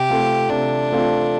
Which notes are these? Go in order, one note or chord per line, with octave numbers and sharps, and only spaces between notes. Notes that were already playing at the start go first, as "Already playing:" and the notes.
Already playing: C3 G4
A3 C4 F4
C3 D4
A3 C4 F4